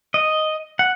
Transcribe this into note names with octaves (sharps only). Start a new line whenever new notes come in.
D#5
F#5